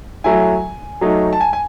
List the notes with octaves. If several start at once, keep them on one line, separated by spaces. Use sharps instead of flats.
F#3 A3 E4 G#5
F#3 A3 D#4
A5
G#5
G#5